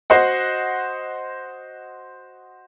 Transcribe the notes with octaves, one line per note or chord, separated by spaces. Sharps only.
F#4 C5 D#5 F#5